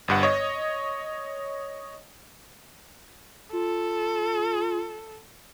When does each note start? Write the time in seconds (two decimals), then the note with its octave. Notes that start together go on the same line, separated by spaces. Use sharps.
0.08 G1 G2 F#5
0.23 C#5 D#5
3.53 F4 A4